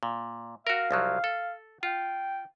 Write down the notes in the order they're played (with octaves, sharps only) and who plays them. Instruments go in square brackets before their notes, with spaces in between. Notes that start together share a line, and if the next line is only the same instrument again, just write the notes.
[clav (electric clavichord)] A#2
[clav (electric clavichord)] F#4 A#4 [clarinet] F5
[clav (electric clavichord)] C2 F3 F#3
A4
[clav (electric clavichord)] F4 [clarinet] G5